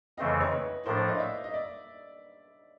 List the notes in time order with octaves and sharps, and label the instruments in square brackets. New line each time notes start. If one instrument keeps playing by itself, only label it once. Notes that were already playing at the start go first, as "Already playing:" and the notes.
[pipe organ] F2 C#3 E3 A3 C4 [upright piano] D#5 F5
[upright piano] C#5 D#5
B4 C#5
[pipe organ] A2 F3 A3 D4 [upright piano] A#4 C5
[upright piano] C5 D5
C#5 D#5
F5
D5 E5
D#5
D5 E5